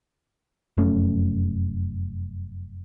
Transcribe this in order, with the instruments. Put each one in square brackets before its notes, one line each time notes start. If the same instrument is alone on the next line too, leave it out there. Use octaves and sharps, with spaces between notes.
[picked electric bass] F1 F#2 A3 C#4